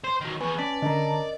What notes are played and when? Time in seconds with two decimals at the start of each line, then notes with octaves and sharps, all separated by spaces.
0.04 C5
0.21 D#3 F#3
0.41 E2 B4 G#5 C#6
0.59 C#4 D5 A5 B6
0.82 D3 A#4 D#5 A5 A#5